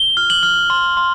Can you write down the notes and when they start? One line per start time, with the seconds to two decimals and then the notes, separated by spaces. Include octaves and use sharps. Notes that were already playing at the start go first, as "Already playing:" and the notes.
Already playing: G7
0.17 F6
0.30 F#7
0.43 F6
0.70 C6
0.97 C6